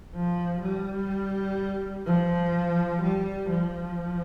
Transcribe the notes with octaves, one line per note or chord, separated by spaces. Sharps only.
F3
G3
F3
G3
F3